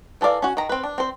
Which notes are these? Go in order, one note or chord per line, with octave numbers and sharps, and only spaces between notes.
E3 A4 A#4 D5 F5
C#4 F#4
D#3 A#5
C4 B4
D4
C4 C5